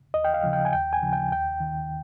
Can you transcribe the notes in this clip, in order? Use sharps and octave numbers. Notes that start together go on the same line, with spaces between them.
D#2 D#5
G5
F5
C#3 F3
G5
G#5
D#2 G5
G#5
C#3 F3
G5
D#2 G5
D#3